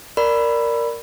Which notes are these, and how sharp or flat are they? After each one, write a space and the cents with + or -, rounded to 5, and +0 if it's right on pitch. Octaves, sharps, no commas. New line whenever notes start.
A#4 +0 D5 +0 B5 +0